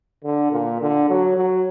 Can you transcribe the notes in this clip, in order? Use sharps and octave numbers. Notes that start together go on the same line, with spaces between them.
D3
A#2
D3
F#3
F#3